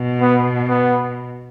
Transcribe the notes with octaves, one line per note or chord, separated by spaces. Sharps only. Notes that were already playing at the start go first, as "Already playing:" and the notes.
Already playing: B2
B3
B3